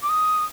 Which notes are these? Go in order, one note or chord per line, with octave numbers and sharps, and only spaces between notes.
D6
D#6